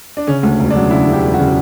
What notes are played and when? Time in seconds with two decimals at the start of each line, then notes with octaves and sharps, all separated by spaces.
0.17 D4
0.27 C#3 C#4
0.43 D2
0.60 E1
0.71 D4
0.75 F#3
0.91 C#3 E4
1.07 C#3
1.13 G4
1.23 E1
1.34 F#4
1.39 C#3